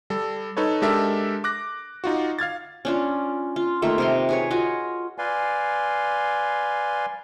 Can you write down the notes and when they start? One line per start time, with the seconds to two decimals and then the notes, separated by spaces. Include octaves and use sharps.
0.10 G3 A4
0.57 D#4 A4 B4 C#5
0.82 G#3 D4 G4 A4 A#4 E5
1.44 D6 F#6 A#6
2.04 D#4 F4 F#4
2.39 F5 F6 G#6 A6
2.85 C#4 D4 F4
3.56 F4
3.82 D#3 A3 A#3 F4
3.98 C3 A#4 C6
4.29 G#4 B4 C#5
4.51 F4 F#4 D#5
5.18 B4 D5 F5 G#5 C6